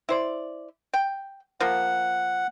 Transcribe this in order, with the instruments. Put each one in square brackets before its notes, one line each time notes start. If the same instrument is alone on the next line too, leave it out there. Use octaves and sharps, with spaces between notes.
[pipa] E4 C5 D5
G5
[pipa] F3 A#3 [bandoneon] F#5